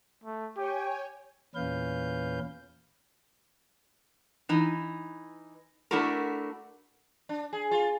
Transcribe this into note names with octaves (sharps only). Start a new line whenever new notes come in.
A3
G4 C#5 G5 G#5
E2 A#2 C#4 B4 F5 G6
E3 D#4
A3 D4 E4 F#4 A4 A#4
D4
G#4
F4